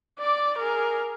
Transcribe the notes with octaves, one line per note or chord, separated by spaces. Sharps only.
D5 D6
G#4 A#4